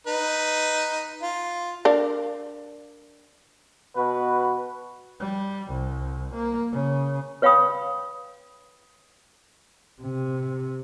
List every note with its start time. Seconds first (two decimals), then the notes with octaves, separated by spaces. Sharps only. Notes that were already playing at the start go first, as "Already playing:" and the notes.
0.07 D#4 B4
1.22 F4
1.85 D4 A#4 F5
3.96 B2 F#4 B4
5.20 G3
5.72 C2
6.35 A#3
6.72 C#3
7.42 B4 C#5 F5 G5 B5 D#6
10.02 C3